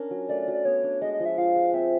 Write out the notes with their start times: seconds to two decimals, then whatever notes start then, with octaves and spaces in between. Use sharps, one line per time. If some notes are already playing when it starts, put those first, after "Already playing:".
Already playing: C#4 D4 A#4
0.11 F#3
0.29 A3 D5
0.41 D5
0.48 F#3
0.54 D5
0.65 B3 C#5
0.84 D4
1.02 G#3 D#5
1.13 D#5
1.20 F3
1.26 E5
1.38 F4 F5
1.55 G#3
1.74 C4 E5